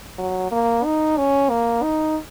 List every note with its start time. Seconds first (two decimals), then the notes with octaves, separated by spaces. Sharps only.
0.18 F#3
0.51 A#3
0.84 D#4
1.18 C#4
1.50 A#3
1.83 D#4